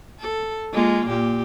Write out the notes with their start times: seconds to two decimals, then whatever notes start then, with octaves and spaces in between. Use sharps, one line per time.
0.20 A4
0.72 G#3 A#3 F4
1.07 A#2 G4